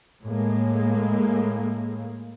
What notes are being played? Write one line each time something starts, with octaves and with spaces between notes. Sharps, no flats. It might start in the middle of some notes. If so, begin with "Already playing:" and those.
A2 G#3 A#3